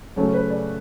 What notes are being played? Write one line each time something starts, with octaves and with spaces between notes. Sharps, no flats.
C#3 F#3 A3 C#4 A4
B4
D5